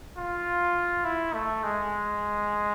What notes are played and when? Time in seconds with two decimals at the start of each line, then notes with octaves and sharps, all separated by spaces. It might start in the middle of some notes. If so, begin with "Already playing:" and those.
0.17 F4
1.04 E4
1.34 A3
1.63 G#3